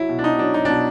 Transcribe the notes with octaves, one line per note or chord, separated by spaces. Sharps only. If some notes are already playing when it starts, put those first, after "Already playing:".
Already playing: F#3 E4
B2
D4
B2 D#4
F#3 D4
F#3 D#4
B2 D4